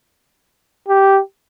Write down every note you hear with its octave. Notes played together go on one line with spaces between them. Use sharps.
G4